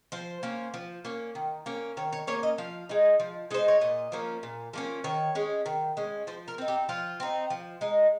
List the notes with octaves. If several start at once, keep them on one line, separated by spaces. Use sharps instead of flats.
F3 C5
A#3 C#4
F3
A#3 C#4
D#3
A#3 C#4
D#3 C#5
C#5
A#3 C#4 C#5
D#5
F3 F5
G#3 D#4
F3
G#3 D#4 C5
C#5
A#2 D#5
F3 A#3 C#4
A#2
F3 A#3 C#4
D#3 C#5
G#3 C#4
D#3
G#3 C#4
F3 C5
A#4
C4 D#4
G4
F3 F4
C4 D#4
F3
G#3 D#4